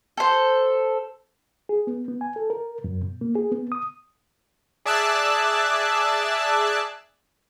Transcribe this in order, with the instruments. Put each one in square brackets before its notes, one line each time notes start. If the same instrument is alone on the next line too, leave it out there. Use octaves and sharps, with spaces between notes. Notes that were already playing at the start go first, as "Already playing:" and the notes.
[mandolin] A4 C5
[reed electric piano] G#4
B3
B3
G#5
A4
A#4
F#2
B2
A#3
G#4
B3
D#6
[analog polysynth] G#4 D5 E5 A5 E6 F#6